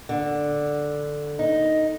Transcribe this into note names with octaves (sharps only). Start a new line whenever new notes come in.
D3
D#4